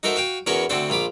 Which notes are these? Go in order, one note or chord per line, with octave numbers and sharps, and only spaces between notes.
D#4 F#4 A4 A#4 C5 E5
F#4 F5 G5
E2 C#4 F#4 A#4 B4 C#6
D2 C4 D4 F#4 A4 C5
A#1 F4 B5 D6